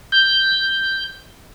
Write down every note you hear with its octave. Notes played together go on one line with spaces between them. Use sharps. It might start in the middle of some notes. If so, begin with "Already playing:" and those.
G6